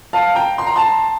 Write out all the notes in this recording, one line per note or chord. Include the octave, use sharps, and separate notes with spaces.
F5 A5
G5 A#5
C6
A#5
A5 C6